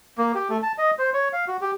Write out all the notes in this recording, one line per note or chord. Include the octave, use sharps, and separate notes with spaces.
A#3
G4
A3
A5
D#5
C5
C#5
F5
F#4
G4